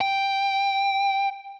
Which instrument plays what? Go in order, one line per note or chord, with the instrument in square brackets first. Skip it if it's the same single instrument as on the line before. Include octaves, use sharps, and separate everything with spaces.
[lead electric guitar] G5